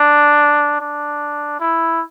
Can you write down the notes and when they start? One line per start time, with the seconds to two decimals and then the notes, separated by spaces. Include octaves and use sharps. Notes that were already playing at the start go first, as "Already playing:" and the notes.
Already playing: D4
0.81 D4
1.60 E4